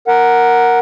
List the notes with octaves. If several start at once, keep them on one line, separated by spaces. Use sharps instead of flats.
A#4 F#5